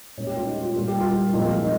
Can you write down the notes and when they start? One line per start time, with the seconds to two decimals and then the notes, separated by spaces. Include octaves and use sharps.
0.17 A#2 G#3 C#4 C#5
0.27 G4
0.36 F4
0.46 D#4
0.61 F4
0.76 A#2 G3 A#3 F4
0.88 G4
1.01 F4
1.34 A#2 F3 G#3 C4 F4
1.49 F4
1.63 D#4